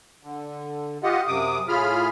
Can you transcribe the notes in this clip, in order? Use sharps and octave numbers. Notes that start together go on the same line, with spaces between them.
D3
F4 G4 D#5 F#5
F#2 C3 D6 D#6
A2 F4 G#4 B5 F6